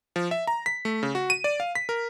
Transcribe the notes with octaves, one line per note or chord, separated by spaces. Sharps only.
F3
E5
A#5
B6
A3
C#3
F#4
D#7
D5
F5
B6
A#4